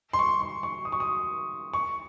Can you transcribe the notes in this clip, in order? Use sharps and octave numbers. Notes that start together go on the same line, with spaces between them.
C6
C#6
C6
C#6
D#6
C#6
D#6
C#6